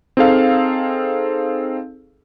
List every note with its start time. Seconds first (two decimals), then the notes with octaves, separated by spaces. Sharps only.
0.17 C4 D#4 G#4 A4 F5